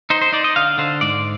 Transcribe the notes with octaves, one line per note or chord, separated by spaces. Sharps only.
D#4 C5
C5
D#4 D5
D#5
D3 F5
D3 C5
G#2 D5